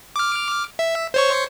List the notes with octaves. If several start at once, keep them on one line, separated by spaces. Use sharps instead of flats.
D6 F6
E5
C5 C#5 C#6